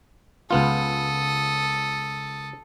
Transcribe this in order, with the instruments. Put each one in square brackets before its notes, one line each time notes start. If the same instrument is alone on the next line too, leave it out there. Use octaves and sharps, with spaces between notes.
[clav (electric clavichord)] C#2 B3 F4 [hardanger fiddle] A4 D#6